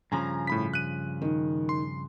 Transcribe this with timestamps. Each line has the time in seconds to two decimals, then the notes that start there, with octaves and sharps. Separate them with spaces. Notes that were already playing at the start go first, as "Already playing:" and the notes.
0.12 G2 C#3 F3 G#5 A#5
0.47 A2 B5 B6
0.74 F#6 D#7
1.22 D#3
1.69 C6